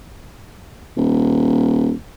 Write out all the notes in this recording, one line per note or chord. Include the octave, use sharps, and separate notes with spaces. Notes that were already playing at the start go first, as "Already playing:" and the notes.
D#1